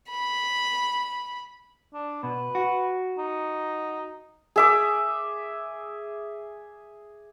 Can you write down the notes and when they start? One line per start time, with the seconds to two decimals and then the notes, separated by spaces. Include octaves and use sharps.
0.10 B5
1.93 D4
2.23 B2 B4
2.55 F#4
3.18 D#4
4.56 G#4 E5 D6